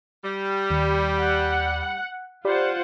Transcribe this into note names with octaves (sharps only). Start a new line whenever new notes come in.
G3
D#2 C#7
F#5
F4 G4 C5 D5 F#5 B5